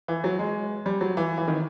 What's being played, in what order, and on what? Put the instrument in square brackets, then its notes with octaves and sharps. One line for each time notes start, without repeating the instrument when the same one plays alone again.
[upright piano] E3
F#3
G#3
G3
F#3
E3
E3
D#3